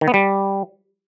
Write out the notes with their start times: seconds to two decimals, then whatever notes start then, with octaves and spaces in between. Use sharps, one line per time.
0.01 D#3
0.08 B3
0.14 G3